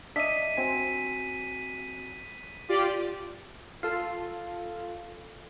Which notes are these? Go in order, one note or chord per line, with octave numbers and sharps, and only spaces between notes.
D4 D#5 E5 B6 D#7
C4 F#4 G#5
F4 G4 D5
F4 A4